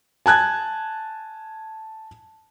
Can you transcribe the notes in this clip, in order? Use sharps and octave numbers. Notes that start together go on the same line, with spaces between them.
G#5 A5 F#6 G#6